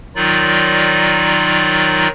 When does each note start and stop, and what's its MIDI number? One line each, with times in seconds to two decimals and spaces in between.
0.16 2.08 51
0.16 2.08 54
0.16 2.08 63
0.16 2.08 65
0.16 2.08 74